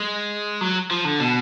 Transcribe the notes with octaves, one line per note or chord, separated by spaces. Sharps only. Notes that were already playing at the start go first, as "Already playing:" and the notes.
Already playing: G#3
F#3
F3
D3
B2